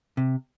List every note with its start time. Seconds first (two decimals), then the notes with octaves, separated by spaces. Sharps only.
0.17 C3